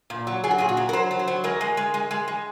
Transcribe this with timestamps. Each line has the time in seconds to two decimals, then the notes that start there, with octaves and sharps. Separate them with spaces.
0.10 A#2
0.27 F#3
0.44 F#3 G#4
0.51 F#4
0.58 A#2 G#4
0.69 F#4
0.77 F#3
0.89 A#4
0.93 F#3 C5
1.11 F#3
1.19 C5
1.28 F#3
1.44 G#3 A#4
1.61 G#3
1.77 G#3
1.94 G#3
2.11 G#3
2.28 G#3